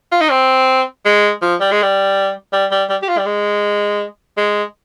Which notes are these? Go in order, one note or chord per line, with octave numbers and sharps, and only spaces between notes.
F4
D#4
C4
G#3
F3
G3
G#3
G3
G3
G3
G3
G4
F4
G3
G#3
G#3